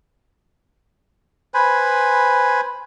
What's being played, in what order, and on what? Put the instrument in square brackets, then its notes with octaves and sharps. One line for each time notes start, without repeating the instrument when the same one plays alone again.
[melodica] B4 C5 G#5 B5